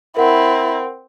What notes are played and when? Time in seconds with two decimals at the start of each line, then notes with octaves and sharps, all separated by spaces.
0.17 C4 E4 A#4 F#5